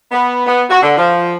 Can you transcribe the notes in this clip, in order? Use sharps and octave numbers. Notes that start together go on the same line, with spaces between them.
B3
B3
F#4
D3
F3